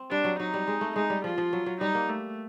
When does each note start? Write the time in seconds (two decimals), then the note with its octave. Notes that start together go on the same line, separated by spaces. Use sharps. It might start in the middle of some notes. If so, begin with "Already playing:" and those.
Already playing: C4
0.10 G3 D4
0.24 F#3
0.39 F#3 D#4
0.54 G3
0.68 G#3
0.81 A3
0.96 G#3 D#4
1.10 G3
1.24 F3 F4
1.38 F3
1.53 F#3
1.66 F#3
1.81 G3 D#4
1.95 A#3
2.09 A3